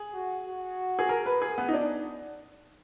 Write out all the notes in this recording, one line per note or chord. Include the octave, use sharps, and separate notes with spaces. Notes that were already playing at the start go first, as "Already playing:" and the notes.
Already playing: G#4
F#4
F#4
G#4
A#4
B4
G#4
B3
D#4
D4